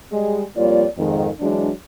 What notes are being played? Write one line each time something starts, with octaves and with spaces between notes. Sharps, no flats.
G3 G#3
F2 G3 A#3 F4 C#5 D5
F2 G#2 D#3
E3 F#3 G#3 D4